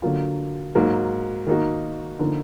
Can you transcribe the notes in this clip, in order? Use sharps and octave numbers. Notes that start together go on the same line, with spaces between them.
D3 F#3 A#3 F4
G#2 F#3 A#3
D#3 A#3 D#4 F#4
D3 F3 A#3 D#4